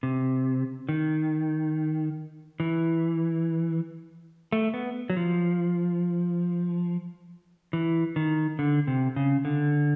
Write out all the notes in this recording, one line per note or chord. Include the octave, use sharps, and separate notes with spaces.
C3
D#3
E3
A3
B3
F#3
F3
E3
D#3
D3
C3
C#3
D3